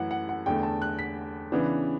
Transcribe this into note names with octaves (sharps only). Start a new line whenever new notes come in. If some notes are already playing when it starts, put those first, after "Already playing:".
Already playing: F#2 E3 A3 E4 F#5
F#5
F#5
E2 D3 A3 G5
A5
F#6
B6
C#3 E3 B3 D4